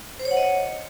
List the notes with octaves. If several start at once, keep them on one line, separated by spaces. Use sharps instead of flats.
C5
C#5
F#5
D#5
C#5